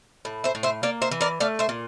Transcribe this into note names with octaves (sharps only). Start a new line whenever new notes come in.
A2
C5 E5
A2
C5 E5
A#3 D5 F5
C5 E5
E3
A#4 D5
A3 D5 F5
C5 E5
A#2